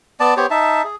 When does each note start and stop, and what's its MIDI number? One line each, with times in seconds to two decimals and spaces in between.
0.20 0.34 59
0.20 0.34 74
0.20 0.34 81
0.37 0.46 59
0.37 0.46 67
0.37 0.46 72
0.37 0.46 73
0.50 0.83 63
0.50 0.83 76
0.50 0.83 81
0.84 0.96 68